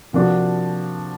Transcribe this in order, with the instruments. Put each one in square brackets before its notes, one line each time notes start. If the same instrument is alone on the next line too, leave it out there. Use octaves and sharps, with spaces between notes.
[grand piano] C3 F3 A#3 D4 F#4